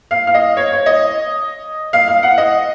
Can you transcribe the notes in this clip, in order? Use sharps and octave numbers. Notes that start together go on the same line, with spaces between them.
F5
F5
D#5
C#5
C#5
D#5
F5
F5
F#5
D#5